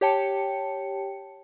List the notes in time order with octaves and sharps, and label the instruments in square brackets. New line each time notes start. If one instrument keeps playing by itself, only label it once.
[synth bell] G4 C#5 G5 A5 C#7